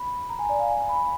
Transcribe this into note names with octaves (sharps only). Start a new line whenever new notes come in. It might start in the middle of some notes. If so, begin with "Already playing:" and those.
Already playing: B5
A#5
G#5
D5
F5
G#5
B5